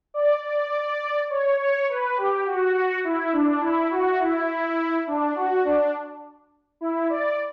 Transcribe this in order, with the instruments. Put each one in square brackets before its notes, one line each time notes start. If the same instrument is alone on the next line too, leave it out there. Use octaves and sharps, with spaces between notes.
[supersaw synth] D5
D5
C#5
C#5
B4
G4
F#4
E4
D4
E4
F#4
E4
D4
F#4
D4
E4
D5